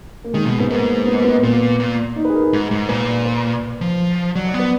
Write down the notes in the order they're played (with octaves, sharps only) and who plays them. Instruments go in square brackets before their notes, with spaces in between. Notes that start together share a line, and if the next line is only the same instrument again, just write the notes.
[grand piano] A#3
[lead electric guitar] D#3 [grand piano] G#3
[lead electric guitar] B2
[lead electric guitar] G#2 [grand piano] B3
[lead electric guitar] G#2 [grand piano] A#3
[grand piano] B3
A#3
B3
[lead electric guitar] A#2 [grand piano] B3
[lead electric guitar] A#2
[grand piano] D#4
B4
G#4
A#4
G#4
[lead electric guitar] G#2
G#2
[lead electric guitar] A#2 [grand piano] B4
[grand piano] D5
B4
[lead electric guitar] F3
[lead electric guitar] F#3 [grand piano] D5
[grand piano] D5
[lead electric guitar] B3
[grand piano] B4